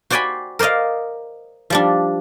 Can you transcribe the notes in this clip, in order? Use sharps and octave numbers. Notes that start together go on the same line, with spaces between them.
F#4 C5 D5 G5 G#5 B5
A#4 C5 D5 D#5 F5
F3 G3 D4